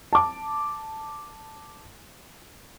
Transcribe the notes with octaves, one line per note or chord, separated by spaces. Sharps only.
A5 D6